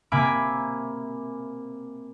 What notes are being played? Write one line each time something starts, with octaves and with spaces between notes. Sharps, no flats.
C3 A#3 E5 G#5 B5 D6